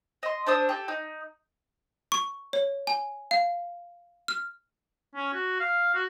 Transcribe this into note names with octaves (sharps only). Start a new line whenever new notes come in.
D#5 C6
D4 C5 D#6 E6
G4 A4
D#4
C#6
C#5
G#5
F5
F6
C#4
F#4
F5
F#4